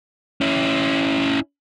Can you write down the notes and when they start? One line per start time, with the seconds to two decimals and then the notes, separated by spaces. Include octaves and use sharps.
0.41 C#4 E4